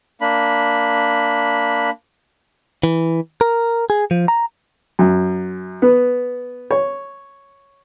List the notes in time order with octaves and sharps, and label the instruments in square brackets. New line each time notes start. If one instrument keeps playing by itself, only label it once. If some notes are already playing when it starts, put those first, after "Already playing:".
[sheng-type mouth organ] A#3 D4 B5
[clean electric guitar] E3
A#4
G#4
F3
A#5
[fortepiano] F#2
B3
C#5